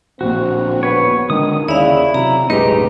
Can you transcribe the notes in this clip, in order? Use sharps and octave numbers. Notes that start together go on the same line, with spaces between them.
D1 A#1 A#3 C4 F#4
B3 B4 C#5
D3 D#3 G#3 D#6
D#2 C#3 E4 D5 F5
C3 F#3 A#5
F#1 B1 A2 G#3 D#4 G4 B4